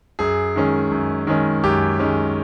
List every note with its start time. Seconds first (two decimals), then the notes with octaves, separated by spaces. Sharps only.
0.19 F#2 G#4
0.56 D#3 G#3 C#4
0.92 F#2
1.27 D#3 G#3 C#4
1.64 F#2 G4
1.99 D#3 G#3 C#4